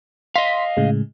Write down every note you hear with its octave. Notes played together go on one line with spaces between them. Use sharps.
D#5 F5 C6 B6
A2 C#3 G#3